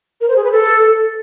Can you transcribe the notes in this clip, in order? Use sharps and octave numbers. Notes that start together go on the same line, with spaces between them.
A#4
C5
G#4
B4
A4